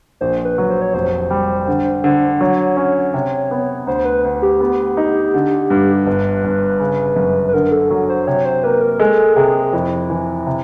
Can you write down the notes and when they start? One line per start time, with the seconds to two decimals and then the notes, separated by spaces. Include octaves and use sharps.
0.21 A#1 C5
0.45 B4
0.58 F#3
0.70 C5
0.81 C#5
0.94 F1 C5
1.31 G3
1.68 D3
2.04 D3
2.41 F#3 C#5
2.77 C#4
3.14 C3
3.51 B3
3.87 D2 C5
4.05 B4
4.24 D2
4.42 G4
4.60 B3
4.97 D#4
5.34 D3
5.70 G2
6.06 G1 B4
6.44 G1
6.80 C#3
7.16 F#2
7.48 B4
7.53 D3 A#4
7.71 A4
7.91 F#3
8.09 C5
8.27 C3 C#5
8.45 C5
8.63 A#3 B4
8.81 A#4
8.99 G#3 A4
9.36 C3 G#4
9.73 F2 E4
10.10 E3
10.47 C3